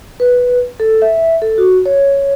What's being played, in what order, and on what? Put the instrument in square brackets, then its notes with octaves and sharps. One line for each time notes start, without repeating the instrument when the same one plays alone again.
[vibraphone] B4
A4
E5
A4
F#4
C#5